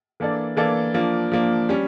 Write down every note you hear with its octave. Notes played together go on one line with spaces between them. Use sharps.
E3 A#3 D4 A4 D5
E3 A#3 D4 A4 D5
F3 A#3 D4
F3 A#3 D4
G3 C#4